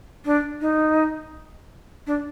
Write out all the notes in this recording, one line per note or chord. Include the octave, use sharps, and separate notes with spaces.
D4
D#4
D4